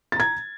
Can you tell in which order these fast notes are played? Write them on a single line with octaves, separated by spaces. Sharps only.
A6 A#5 G#6